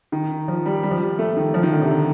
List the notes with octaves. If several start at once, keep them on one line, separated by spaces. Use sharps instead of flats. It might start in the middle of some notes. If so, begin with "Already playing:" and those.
D#3
F3
G3
G3
F3
G3
A3
D#3
F3
D#3
D3
C3